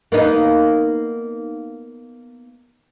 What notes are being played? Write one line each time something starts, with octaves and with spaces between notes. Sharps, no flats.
A#3 B3 D#4